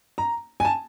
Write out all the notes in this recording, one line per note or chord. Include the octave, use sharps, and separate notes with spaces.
A#5
G#5
A5